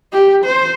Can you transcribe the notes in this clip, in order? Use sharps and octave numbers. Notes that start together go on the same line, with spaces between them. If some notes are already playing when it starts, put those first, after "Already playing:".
G4
C5